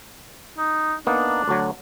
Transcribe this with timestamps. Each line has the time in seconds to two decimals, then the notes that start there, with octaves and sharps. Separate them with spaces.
0.58 D#4
1.07 A#3 B3 D4 D#4
1.48 D2 F#3